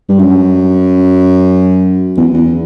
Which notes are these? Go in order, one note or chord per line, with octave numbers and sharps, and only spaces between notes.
G2
F#2
E2
E2